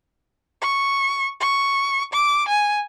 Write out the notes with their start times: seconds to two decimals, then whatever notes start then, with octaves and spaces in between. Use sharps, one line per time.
0.61 C#6
1.40 C#6
2.13 D6
2.48 G#5